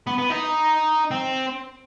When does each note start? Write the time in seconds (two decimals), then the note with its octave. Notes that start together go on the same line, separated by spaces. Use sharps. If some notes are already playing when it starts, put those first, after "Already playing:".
0.07 B3
0.18 B3
0.30 D#4
1.11 C4